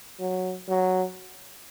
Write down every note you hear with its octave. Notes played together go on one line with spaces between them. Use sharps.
F#3
F#3